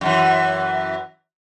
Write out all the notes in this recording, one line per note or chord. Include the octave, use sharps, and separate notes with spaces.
F#2 D3 E3